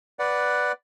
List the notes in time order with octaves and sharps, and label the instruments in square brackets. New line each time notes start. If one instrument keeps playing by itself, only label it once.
[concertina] B4 D5 F#5